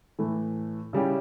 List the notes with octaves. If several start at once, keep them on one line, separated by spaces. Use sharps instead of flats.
A2 E3 A3
C#3 G3 C#4 E4 G4